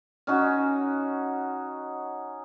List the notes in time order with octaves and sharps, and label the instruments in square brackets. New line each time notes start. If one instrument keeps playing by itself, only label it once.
[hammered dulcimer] C#4 D#4 F#4